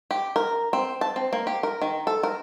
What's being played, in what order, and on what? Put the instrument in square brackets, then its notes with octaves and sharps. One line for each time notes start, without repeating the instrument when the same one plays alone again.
[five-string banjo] G4
A#4
C4
A5
C4
A#3
G4
A#4
D#3
A4
A#4